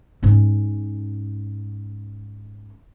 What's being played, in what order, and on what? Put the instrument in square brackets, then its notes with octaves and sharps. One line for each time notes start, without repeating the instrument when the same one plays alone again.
[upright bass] G#2 C#4